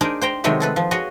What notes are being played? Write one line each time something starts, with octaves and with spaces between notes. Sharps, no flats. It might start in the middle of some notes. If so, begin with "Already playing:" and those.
D4 D#4 G#4 A#4 C5
C5 G5 A#5
C3 D#3 F#3 G#3 A3 B3
G#4 A4 B4
F3
F#4 G#4 C#5 D#5